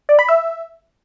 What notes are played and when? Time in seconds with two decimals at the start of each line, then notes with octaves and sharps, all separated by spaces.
0.09 D5
0.19 B5
0.29 E5